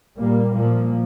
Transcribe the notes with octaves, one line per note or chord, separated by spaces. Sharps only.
A#2 G3 A#3
A#2 F3 A#3